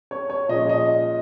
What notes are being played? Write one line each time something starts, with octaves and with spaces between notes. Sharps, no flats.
C#5
C#5
A#2 F3 G#3 C#4 D#5
D#5